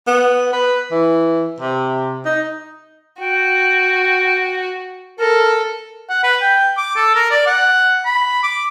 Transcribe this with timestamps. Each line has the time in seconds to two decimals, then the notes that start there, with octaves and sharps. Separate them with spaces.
0.07 B3
0.53 B4
0.91 E3
1.60 C3
2.25 D#4
3.20 F#4 G5
5.19 A4 A#4
6.09 F#5
6.24 B4
6.42 G5
6.77 D6
6.96 A4
7.15 A#4
7.31 D5
7.47 F#5
8.05 B5
8.43 D6